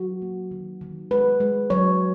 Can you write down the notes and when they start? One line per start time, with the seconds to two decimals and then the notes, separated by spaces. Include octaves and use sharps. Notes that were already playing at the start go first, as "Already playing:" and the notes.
Already playing: F#3 F#4
0.22 A#3
0.51 D#3
0.81 D#3
1.11 G#3 B4
1.40 G#3
1.70 F#3 C#5